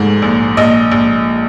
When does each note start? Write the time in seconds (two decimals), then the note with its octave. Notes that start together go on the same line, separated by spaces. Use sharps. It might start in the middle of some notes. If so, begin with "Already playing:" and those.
Already playing: F1 G#2
0.22 A#1
0.57 A#1 D#5
0.92 A#1